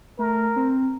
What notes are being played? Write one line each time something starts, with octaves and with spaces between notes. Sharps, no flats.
A3 A#4
C4